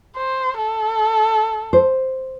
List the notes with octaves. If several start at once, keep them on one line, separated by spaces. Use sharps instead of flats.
C5
A4
C5